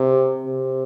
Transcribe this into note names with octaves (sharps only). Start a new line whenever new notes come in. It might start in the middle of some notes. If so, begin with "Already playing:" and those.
Already playing: C3
C3